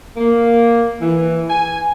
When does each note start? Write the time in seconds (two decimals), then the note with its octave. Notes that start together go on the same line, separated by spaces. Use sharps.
0.17 A#3
1.00 E3
1.49 G#5